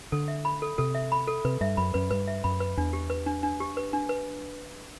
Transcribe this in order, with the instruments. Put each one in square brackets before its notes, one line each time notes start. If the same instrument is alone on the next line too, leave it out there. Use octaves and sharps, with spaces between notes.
[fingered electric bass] D3 [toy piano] A4
[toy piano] E5
B5
A4
[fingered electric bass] C3 [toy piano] A4
[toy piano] E5
B5
A4
[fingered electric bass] C3 [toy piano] B4
[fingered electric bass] G2 [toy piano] E5
[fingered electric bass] F#2 [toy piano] B5
[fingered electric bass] F#2 [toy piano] B4
[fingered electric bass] G2 [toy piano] B4
[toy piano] E5
[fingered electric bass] F#2 [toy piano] B5
[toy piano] B4
[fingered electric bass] E2 [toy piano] D4
[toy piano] G4
B4
D4
D4
G4
B4
D4
B4